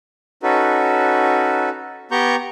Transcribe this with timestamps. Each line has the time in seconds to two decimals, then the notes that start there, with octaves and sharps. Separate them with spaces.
0.43 C#4 D#4 F#4 A4 B4
2.11 B3 G4 A#5 C#6 G6